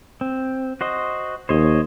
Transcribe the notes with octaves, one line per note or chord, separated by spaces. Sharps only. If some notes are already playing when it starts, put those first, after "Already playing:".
C4
F#4 C5 D#5
D#2 C5 C#5 D#5